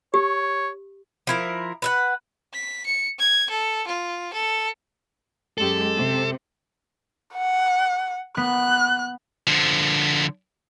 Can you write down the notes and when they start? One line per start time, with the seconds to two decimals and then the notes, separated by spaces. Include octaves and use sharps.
0.14 G4 C#5
1.27 F3 E4 A#4
1.82 B4 E5 F#5
2.54 B6
2.86 C#7
3.19 G#6
3.50 A4
3.87 F4
4.33 A4
5.58 F#2 G#3 G4 A4
5.96 C3
7.34 F#5
8.37 B3 F#6
9.47 D3 F3